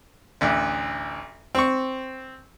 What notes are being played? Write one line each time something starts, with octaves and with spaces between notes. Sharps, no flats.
A1 D2
C4 C#6